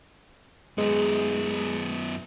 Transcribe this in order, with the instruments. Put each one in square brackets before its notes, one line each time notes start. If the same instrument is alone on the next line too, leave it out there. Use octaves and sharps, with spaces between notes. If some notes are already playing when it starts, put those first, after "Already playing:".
[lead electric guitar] F#2 B3 [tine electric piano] G#3